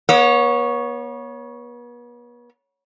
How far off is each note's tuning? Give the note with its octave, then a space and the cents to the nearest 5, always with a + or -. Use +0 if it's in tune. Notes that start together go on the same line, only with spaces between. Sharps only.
B3 -40 C#5 +0